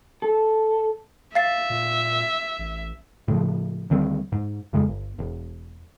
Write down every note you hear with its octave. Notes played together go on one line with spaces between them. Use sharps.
A4
E5 F5 A6 C7
A#2
A1
A2 C#3 F3
D2 D#3 G3 C4
G#2
F2 C#3 G#3
G1
E1